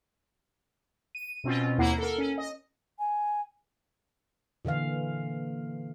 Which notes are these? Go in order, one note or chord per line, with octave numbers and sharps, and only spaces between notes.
D#7
B2 C4 C#4 F4
D#2 A#3 E4 F#5 A#5 C7
A4 A#4
C#4
D#5
G#5
A#2 D3 E3 F5